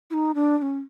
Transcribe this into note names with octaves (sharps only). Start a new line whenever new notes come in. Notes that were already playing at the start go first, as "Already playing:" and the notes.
E4
D#4
D4
D4
C#4